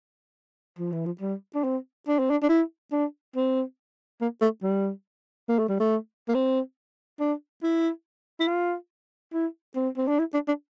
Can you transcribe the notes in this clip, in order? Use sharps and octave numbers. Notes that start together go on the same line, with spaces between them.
F3
E3
F3
G3
D4
C4
D4
C4
D4
D4
E4
D4
C4
A#3
A3
G3
A#3
A3
G3
A3
A#3
C4
D4
E4
E4
F4
E4
C4
C4
D4
E4
D4
D4